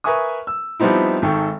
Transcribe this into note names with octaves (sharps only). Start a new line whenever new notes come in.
A#4 B4 E5 G#5 C#6 D#6
E6
F3 G3 B3 C4 D#4 E4
G#1 D#3 A4 G5 C#6